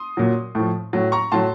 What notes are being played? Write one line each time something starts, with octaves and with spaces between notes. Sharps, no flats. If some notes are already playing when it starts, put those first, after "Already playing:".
Already playing: C6 D#6
A#2 F#3
A2 F3
A2 F#3
A#5 C#6
A2 F#3 A5 C6